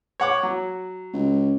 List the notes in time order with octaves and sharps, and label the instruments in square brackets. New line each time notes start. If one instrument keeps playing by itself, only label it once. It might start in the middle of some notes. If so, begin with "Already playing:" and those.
[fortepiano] C#5 F#5 D6
F#3
[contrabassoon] C#2